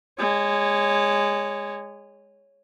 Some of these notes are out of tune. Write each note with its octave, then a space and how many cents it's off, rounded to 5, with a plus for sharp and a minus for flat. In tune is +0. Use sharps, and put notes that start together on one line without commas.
G#3 -15 C#5 +0